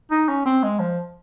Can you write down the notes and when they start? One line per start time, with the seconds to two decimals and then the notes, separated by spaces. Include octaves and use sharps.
0.11 D#4
0.28 C#4
0.46 C4
0.63 G#3
0.80 F3